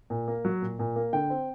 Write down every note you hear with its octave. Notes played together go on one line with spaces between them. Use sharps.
A#2
A#3
F#3
A#2
A#2
A#3
D3 G5
C4